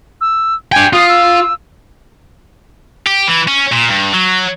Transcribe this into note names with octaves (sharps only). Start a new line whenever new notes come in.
E6
D4 G5 G#5
F4 D#6
E6
G4
E3
C#4
A#2
G2
F#3